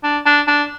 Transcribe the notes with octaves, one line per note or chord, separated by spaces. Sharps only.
D4
D4
D4